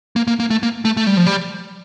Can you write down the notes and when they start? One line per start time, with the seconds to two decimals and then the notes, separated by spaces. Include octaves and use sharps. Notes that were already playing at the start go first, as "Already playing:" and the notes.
0.16 A#3
0.27 A#3
0.40 A#3
0.50 A3
0.63 A#3
0.85 A3
0.97 A3
1.07 G3
1.17 F3
1.27 G3